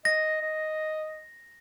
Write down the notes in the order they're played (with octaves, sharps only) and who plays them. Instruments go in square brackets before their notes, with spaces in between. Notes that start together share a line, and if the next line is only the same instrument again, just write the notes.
[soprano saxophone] D#5 [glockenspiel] A#6
[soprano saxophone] D#5